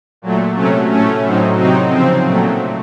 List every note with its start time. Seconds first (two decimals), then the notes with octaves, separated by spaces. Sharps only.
0.22 A#2 F#3 A3
0.56 C3 F#3 A3 C#4
0.89 A2 A3 C#4
1.23 A2 F#3 C4 D#4
1.57 C3 F#3 C4 D#4
1.90 C#3 F3 C4
2.25 A#2 F#3 A3